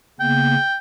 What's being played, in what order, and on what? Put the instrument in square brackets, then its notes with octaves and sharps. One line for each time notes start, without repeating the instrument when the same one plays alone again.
[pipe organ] C#3 A#3 B3 [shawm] G5